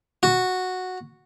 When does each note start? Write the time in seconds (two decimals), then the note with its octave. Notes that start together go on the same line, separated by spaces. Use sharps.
0.23 F#4